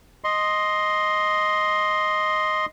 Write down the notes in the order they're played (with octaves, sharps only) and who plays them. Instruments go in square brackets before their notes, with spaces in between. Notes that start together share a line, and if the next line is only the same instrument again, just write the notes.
[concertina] D#5 C6